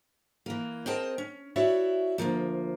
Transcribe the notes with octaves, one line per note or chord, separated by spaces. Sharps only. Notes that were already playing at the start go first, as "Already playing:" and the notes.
E3 A#3
C4 G#4 A#4 D#5 G5 A5
C#4
E4 F#4 C#5 D5 E5
D2 G#2 F3 A#3